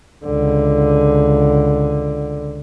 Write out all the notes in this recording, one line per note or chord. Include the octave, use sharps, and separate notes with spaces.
C#2 D3